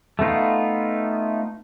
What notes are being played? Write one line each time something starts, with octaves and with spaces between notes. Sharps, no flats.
A3 B3 D#4 F4